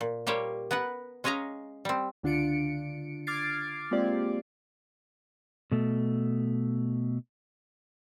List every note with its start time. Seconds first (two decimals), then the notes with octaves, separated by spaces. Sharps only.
0.01 A#2
0.27 G3 A#3 G4 C5 C#5
0.71 B3 A#4 B4 F#5
1.24 G#3 C#4 C#5 D#5 F5 A#5
1.85 G3 C4
2.23 C#2 D3 D4 F4 C#7 D7
3.27 D6 F6 G#6 A6 C7 D7
3.91 G#3 A#3 C4 F4 G4 D5
5.72 B2 A3